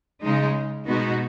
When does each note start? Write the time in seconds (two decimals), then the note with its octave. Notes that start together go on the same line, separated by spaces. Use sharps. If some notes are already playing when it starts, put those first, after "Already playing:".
0.22 C#3 G#3 D#4
0.87 B2 G#3 B3 D#4 F#4